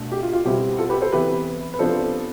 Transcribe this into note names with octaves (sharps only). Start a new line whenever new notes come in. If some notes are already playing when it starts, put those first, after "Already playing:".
Already playing: B2 A3 D4
G4
F4
F4
B2 G3 C4 E4 G4
F4 A4
G4 B4
A4 C5
C3 E3 B3 E4 G4 B4
B4
C3 F3 B3 D4 F4 A4 C5